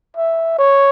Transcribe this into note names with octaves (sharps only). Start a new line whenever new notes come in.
E5
C#5